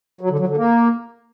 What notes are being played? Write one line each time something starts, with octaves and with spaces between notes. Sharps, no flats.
F#3
D3
F#3
D3
A#3